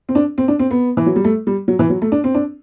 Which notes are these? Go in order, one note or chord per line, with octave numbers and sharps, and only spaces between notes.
C4
D4
C4
D4
C4
B3
E3
F#3
G3
A3
G3
F#3
E3
F#3
A3
D4
C4
D4